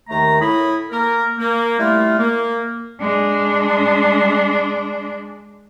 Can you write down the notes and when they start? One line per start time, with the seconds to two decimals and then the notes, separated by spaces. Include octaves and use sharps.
0.09 D#2 D#3 A3 A#5
0.41 A2 E4 C#5 B5 D#6
0.91 A#3 A#4
1.38 A#3
1.80 G3 A3 E4 F4 F5
2.19 A#3
3.01 G#3 D4